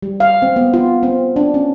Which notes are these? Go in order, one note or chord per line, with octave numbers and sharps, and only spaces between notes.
G3
F5
C4
B3
F4
C4
D4
C#4